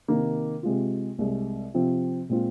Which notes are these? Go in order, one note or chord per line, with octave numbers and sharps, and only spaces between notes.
C3 D#3 A#3
C3 G#3 F4
C2 C3 G#3
C3 F3 C4 F4
A#2 G#3 C4 F4